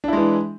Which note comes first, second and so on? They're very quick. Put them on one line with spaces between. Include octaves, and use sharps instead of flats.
D4 E4 G#3 E3